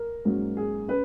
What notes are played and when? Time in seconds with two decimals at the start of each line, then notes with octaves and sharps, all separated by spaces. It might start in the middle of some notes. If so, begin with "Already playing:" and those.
Already playing: A#4
0.25 G#2 F#3 A#3 C#4
0.57 G#4
0.88 C#4 B4